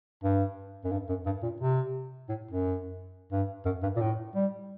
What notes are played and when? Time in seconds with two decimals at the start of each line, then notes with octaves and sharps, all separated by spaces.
0.24 G2
0.84 F#2
0.92 G2
1.09 F#2
1.26 G2
1.43 A#2
1.61 C3
2.29 A2
2.51 F#2
3.32 G2
3.66 F#2
3.83 G2
3.97 A#2
4.01 A2
4.35 G3